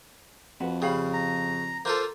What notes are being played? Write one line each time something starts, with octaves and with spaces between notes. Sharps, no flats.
F2 F#4 B4
C#3 G4 F5 B5
A#5
A#3 F4 A4 C5